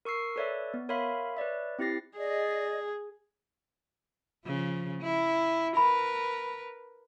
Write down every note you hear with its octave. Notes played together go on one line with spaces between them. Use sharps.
A#4 C#6 E6 C7 C#7
A4 B4 C#5 D5 E5
B3
A#4 C#5 E5 F5 B5 C6
B4 C#5 D5 E5
C4 E4 G4 A6 A#6 C7
G#4 D5 D#5
C#3 F3
E4
A#4 B4 B5